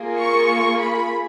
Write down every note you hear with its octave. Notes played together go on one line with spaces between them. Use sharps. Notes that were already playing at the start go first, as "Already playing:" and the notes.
Already playing: A#3 F4 G#4
C#6
B5